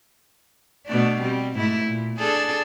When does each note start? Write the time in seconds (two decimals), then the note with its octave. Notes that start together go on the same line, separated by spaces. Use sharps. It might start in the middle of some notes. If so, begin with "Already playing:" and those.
0.86 B2 A3 D4
1.22 G3 C4
1.54 G#2 A3 E4
1.85 A#2
2.19 D4 G#4 A4